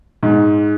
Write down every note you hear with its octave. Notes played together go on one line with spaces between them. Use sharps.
G#2